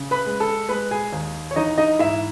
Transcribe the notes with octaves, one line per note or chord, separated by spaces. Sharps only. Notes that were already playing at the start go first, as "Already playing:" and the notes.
Already playing: C#3
B4 B5
G#3
A4 A5
G#3 B4 B5
G#4 G#5
D#2
C#5
E3 D#4 D#5
D#4 D#5
G#2 E4 E5